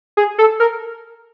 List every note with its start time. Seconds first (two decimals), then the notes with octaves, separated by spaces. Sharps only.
0.17 G#4
0.38 A4
0.60 A#4